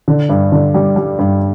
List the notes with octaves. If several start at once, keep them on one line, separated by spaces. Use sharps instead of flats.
D3
G2
D3
G3
G3
G2